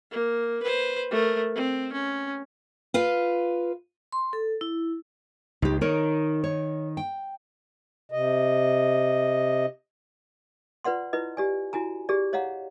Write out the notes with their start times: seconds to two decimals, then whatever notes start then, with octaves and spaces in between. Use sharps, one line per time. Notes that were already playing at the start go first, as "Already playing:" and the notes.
0.11 A#3
0.62 B4 C5
1.11 A3 A#4
1.55 C4
1.92 C#4
2.94 F4 B4 F5
4.12 C6
4.33 A4
4.61 E4
5.62 C#2 D#4 G4
5.81 D#3 D#4 A#4 C#5
6.44 C#5
6.97 G5
8.12 C3 D#5
10.84 F4 B4 D5 F#5 C6
11.13 E4 F4 B4 D#5
11.37 G4 D5 G#5
11.73 E4 F#4 G#5 A#5
12.09 G4 G#4 D5
12.33 C#5 D#5 F5 F#5 A#5